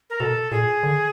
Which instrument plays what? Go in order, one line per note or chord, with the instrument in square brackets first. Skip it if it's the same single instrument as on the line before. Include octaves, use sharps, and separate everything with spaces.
[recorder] A#4
[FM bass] B2 [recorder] A4
[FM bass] A#2 [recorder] G#4
[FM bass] D3